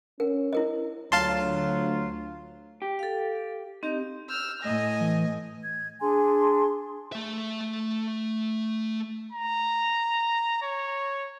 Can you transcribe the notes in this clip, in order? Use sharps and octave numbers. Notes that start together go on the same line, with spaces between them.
C#4 A#4
E4 A#4 D#5
D2 F#3 F4 F5 A5 C6
G4
A4 F5
C4 D#4 G4
E6 F6 G6
A2 D#5 G#5 A#6
E3
G#6
D4 G#4 G#5 C6
A3 E5
A#5
C#5